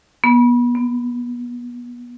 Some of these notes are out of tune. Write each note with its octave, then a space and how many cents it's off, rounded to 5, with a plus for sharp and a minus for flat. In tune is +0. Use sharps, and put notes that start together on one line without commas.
B3 -30
B3 +30